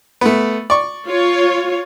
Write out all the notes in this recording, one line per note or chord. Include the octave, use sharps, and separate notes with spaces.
A3 B3
D5 C#6
F4 C#5